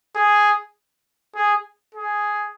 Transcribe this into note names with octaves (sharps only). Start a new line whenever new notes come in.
G#4
G#4
G#4